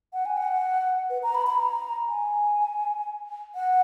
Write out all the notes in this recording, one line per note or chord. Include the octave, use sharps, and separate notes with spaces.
F#5
G#5
F#5
B4
A#5
B5
B5
A#5
G#5
F#5